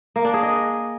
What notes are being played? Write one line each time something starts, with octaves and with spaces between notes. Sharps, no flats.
A#3
D4
G#4
D#5